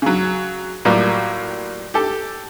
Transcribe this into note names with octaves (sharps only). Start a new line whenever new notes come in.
C#3 F#3
A2 F#3 G3 A#3 F4
G4 A4